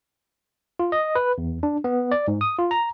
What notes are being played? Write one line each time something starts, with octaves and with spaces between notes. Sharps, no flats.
F4
D#5
B4
E2
D4
B3
D5
G#2
D#6
F4
A#5